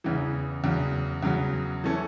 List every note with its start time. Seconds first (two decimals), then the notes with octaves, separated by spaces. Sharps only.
0.04 E2 C#3 E3
0.64 E2 C#3 F#3
1.23 E2 C#3 F#3
1.84 E3 A3 C#4